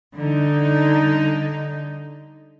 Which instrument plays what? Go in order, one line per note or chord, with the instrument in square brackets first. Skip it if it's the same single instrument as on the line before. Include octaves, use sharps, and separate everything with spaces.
[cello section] D3 G3 D#4